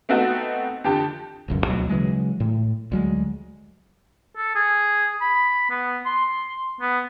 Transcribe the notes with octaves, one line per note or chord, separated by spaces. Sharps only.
A3 B3 C4 D#4 F#4 A4
F2 D3 G4 A5
E1 C#2 F#2
D2 B2 F#3
C#3 E3 F#3 G#3
A2
D2 F#3 G#3
A4
G#4
B5
B3
C6
B3